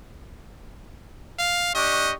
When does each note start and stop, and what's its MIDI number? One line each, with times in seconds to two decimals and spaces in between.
1.39 1.74 77
1.75 2.11 62
1.75 2.11 67
1.75 2.13 75
1.75 2.11 85